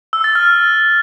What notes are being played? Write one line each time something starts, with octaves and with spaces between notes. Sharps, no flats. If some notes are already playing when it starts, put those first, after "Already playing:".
E6
A6
F6